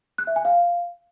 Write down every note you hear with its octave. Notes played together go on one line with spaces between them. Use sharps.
F#6
E5
G#5
F5